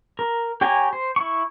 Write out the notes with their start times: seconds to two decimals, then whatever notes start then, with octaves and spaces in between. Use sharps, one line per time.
0.19 A#4
0.61 G4 C#5 G5 G#5 A#5
0.93 C5
1.16 E4 C#6